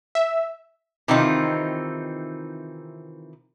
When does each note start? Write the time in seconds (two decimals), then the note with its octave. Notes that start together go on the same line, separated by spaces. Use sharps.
0.15 E5
1.08 C3 D#3 E3 C4 D#4 F4